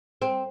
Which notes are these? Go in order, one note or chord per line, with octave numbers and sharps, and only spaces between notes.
C4